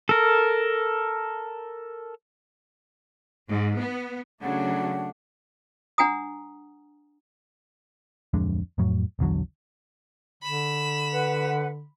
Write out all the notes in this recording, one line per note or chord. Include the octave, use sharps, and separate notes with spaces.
A4 A#4
G#2
B3
C#3 F#3 A3 D4 F#5
D4 F#5 G#5 A#5 D#6
D1 F2 G#3 D4
F2 A2 F#3
A#1 E2 D3 F#3
D3 B5 E7
B4 F#5